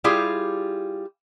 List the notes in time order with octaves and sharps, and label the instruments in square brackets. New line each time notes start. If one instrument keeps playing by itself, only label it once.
[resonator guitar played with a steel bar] G3 E4 F4 G4 G#4